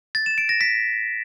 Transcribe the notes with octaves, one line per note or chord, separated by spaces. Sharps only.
A6
E7
D7
A#6
B6